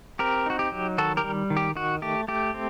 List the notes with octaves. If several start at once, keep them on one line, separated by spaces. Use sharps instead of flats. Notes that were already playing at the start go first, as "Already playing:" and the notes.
C4 G4 A#4
D#4 F#4
G4
F#3
D#3 F#4 A4
G4 A#4
G3
D#3
G4
D#3 F#4
A3 G4
A3 G4
C4